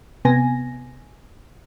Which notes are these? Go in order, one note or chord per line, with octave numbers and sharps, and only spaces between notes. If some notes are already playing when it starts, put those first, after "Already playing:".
C3 B3 G#5 A#6